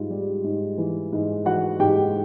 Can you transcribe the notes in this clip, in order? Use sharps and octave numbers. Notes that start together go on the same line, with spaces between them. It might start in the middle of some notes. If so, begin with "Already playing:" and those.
Already playing: G#2 G3 F4
G3
G#2
E3
G#2
E3 F#4 F#5
G#2 G4 G5